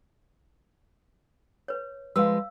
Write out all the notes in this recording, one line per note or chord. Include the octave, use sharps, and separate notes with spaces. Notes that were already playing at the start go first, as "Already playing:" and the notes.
B4 C#5
F3 G#3 B4 F5 E6